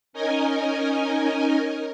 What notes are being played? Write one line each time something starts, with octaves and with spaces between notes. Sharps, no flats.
C#4 D#4 A#4 D#5 G#5